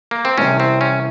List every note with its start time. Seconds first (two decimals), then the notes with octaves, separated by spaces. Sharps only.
0.11 A#3
0.25 C4
0.38 C2 C3 E3 C#4
0.60 C4
0.81 C#4